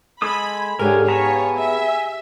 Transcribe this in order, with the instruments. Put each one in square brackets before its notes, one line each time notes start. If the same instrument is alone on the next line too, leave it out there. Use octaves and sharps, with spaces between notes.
[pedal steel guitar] G#3 A4 D#6 [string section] B5 [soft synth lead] G#6
[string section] G#2 D3 [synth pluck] G4 G#4 F5 [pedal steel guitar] A#4 C#5 [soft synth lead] G#5
[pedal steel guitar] B3 A5 A#5 [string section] C#5
[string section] E5